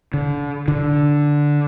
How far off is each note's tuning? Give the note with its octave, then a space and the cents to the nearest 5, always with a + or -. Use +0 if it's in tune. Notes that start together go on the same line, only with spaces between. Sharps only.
D3 -30
D3 -5